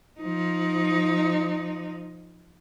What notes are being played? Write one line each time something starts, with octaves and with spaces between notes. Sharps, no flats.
F3 D#4